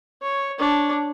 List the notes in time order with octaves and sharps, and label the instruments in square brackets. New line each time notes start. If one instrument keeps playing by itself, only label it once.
[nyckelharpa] C#5
D4 C#5